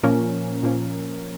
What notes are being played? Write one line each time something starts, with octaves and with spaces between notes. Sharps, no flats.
A#2 F3 A#3 C#4 A#4
A#2 F3 A#3 C#4